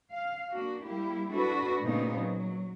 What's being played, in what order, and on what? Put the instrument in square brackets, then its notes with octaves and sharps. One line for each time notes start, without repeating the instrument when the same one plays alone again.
[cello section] F5
A#3 D4 F#4
G3 A#3 E4 G4
D4 E4 F#4 A4 B4
A#2 C#3 A3 B3 C4 D#4
F#3